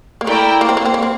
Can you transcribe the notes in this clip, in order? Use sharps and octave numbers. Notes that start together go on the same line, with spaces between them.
A#3
A3 E4 A#4 D5 G5
A#3
C4
A#3
C4
A#3
C4